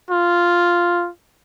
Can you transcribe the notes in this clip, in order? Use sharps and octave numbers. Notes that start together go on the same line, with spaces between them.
F4